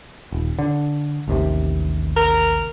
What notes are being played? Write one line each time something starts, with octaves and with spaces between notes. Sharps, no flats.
D#1
D3
A1 D#2 C3
A#4